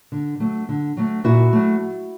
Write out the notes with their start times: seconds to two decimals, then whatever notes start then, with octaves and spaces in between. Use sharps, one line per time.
0.12 D3
0.40 F#3 A3
0.69 D3
0.97 F#3 A3
1.24 A#2 E4 F#4
1.53 F#3 A3